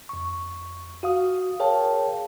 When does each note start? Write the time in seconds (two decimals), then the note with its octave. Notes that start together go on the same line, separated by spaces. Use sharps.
0.09 F2 C#6
1.03 F#4 F5 D#6
1.60 G#4 A#4 C#5 F5 G5 A5